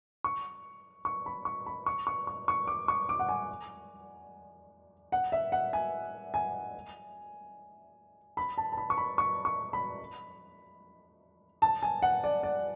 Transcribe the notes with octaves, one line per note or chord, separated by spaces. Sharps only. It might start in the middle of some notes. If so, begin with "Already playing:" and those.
C#6
C#6
B5
C#6
B5
C#6
C#6
C#6
C#6
D6
C#6
D6
F#5
G#5
F#5
E5
F#5
G#5
G#5
B5
A5
A5
B5
C#6
B5
C#6
C#6
B5
A5
G#5
F#5
D5
D5